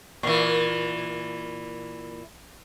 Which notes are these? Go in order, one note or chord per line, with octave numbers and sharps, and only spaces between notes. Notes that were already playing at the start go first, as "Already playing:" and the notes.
A#2 E3